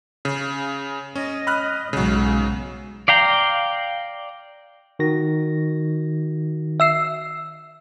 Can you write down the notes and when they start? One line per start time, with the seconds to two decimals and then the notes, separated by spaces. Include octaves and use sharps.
0.25 C#3
1.15 C#4 D#5
1.47 B5 F6 F#6
1.93 B1 G#2 C#3 F#3
3.08 D5 F5 G5 A#5
4.99 D#3 F#4 A#6
6.80 E5 E6 C7